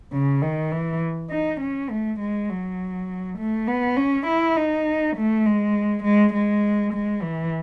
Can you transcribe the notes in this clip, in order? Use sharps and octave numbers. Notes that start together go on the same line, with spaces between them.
C#3
D#3
E3
D#4
C#4
A3
G#3
F#3
A3
B3
C#4
E4
D#4
A3
G#3
G#3
G#3
G#3
E3